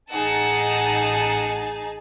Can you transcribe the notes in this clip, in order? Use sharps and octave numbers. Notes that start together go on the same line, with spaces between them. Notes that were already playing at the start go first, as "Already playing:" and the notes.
A1 D#4 G#4 F#5 A5 E6